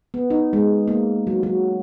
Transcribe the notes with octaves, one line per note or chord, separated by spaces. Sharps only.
B3
D#4
G#3
A#3
F#3
F#3